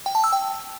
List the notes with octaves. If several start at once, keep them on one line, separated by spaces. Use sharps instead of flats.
G5
A5
E6
G5